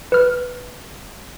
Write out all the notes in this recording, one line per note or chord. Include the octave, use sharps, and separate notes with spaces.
B4 F6